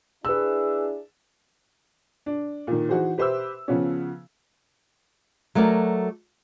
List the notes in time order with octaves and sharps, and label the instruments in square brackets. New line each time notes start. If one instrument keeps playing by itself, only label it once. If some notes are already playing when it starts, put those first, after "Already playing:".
[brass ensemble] D4 E4 G#4 [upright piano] B4 E6
[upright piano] D4
A#2 D#3
E3 D#4 F#4 G#4 C5
G4 B4 C5 E5 D6 E6
C#3 F3 B3 C#4
[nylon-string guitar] F#3 A3 F#4 A#4 D5